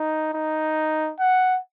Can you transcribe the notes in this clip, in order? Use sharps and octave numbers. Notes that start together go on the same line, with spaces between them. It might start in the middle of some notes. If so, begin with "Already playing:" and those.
Already playing: D#4
D#4
F#5